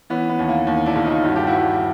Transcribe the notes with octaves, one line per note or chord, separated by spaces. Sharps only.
E3 B3 C#4
B3
D#2
A#3
D#2
D4 E4
C#3
D#4 F4
G2 F#4
G4
E4 F#4
G2